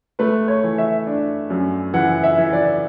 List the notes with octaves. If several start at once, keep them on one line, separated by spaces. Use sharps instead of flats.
A3 B4
C#5
E3
E5
D4
F#2
E3 F#5
E5
E3
D5